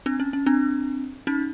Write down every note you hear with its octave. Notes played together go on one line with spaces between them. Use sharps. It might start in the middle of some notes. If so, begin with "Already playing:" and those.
C4 D4
C#4
C#4
C4 D4
C#4 D#4